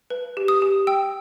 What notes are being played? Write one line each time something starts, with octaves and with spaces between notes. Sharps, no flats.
B4
G4
D#6
G4
G5 E6